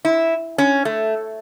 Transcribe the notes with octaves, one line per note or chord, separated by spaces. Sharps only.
E4
C#4
A3